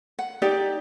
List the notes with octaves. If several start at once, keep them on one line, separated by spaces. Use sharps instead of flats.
F#5
D#4 G4 D5